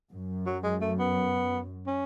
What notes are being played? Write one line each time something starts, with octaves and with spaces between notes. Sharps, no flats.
F#2
F#3
G#3
A3
B3
C#4